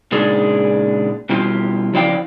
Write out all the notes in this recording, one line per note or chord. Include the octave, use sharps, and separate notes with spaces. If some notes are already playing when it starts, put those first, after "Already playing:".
A#2 C#3 G#3 D4 D#4 G#4
B2 G3 E4 F4 G4
C#3 F3 E4 D5 F5 G5